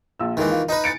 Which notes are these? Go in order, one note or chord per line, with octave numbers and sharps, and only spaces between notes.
A#1 F4 E6
D#2 D#3 E3 G#3
F4
D#4 B4 D#5
A6 C#7 D7